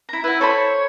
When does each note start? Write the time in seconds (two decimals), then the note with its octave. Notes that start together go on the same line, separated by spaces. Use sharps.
0.09 E4 A#5
0.24 E4 B4 F#5
0.41 A4 C5 C#5 B5